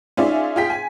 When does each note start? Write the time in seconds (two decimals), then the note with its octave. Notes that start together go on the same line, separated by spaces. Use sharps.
0.17 C#4 D#4 F4 G#4 D5 E5
0.56 F4 G#4 G5 B6
0.70 G#5